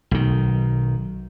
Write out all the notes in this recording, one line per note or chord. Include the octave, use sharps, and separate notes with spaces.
B1 D#3